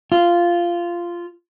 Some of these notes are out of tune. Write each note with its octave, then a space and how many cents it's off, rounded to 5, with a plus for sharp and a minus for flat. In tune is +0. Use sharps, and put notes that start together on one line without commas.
F4 -10